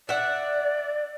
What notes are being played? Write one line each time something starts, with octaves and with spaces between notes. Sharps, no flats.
D5 E5 F#5